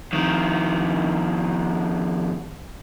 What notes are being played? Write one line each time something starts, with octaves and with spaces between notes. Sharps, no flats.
F2 D#3